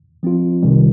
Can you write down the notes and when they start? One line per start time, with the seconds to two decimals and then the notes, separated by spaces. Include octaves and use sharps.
0.23 F3 C4 F4
0.63 C2 C3 D#3 G3